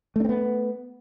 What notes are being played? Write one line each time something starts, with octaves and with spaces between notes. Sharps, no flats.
A3 B3 C4 D4